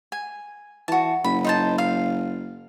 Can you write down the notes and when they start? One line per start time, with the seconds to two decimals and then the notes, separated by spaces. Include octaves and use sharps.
0.12 G#5
0.88 E3 F#4 A5
1.24 F#1 B5
1.44 D#4 C5 A5
1.78 F5